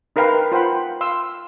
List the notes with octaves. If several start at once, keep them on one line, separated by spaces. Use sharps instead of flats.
D#4 A#4 B4 F5 G5
F4 C5 F#5 G5 B5
F5 C6 E6